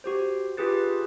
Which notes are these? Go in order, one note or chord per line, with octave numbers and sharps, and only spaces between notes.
F#4 G4 C5
F4 G4 G#4 B4 A6